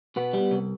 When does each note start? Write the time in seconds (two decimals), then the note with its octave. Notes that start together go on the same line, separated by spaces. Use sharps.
0.16 B2 B3
0.33 G3
0.51 C2